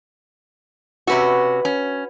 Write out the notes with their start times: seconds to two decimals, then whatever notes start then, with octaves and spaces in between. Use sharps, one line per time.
1.07 C3 C#4 F#4 B4 E5
1.65 C#4